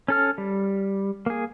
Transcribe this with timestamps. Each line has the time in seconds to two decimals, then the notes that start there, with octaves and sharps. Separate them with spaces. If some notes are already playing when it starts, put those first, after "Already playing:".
0.08 C#4 A4 F6
0.38 G3
1.26 A#3 G#4